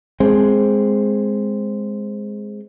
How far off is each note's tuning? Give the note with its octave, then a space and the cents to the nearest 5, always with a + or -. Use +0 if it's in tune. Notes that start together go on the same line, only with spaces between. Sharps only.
G#3 +0 C4 +5